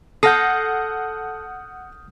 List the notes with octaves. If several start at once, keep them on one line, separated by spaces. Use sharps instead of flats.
A4 F#5 D#6 F6 G6 A#6 C7